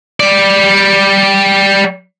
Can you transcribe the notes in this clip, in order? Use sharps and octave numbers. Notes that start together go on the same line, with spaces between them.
G3 D5